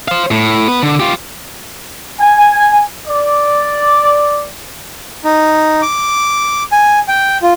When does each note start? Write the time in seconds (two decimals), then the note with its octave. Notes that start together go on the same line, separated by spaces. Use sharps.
0.08 C5 F5
0.31 A2
0.67 B3 B4
0.83 D3
1.00 F4 G4
2.20 G#5
3.07 D5
5.24 D#4
5.82 D6
6.72 G#5
7.08 G5
7.42 F4